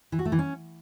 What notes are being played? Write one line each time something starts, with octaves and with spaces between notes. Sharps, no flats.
E3
F#4
A3
E3
C#4